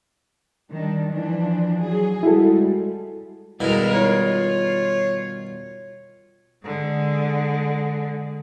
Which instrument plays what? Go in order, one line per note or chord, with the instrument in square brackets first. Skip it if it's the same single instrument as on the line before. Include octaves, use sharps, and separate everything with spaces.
[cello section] D#3 G3 D4
E3 F3 D4
F#3 G#4
[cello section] G3 G#3 [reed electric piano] E4 F#4 A4
[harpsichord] G2 B2 D#3 [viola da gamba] G#3 A4 A#4 [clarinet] E4
[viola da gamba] F4 [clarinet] C#5
[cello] D3 G#3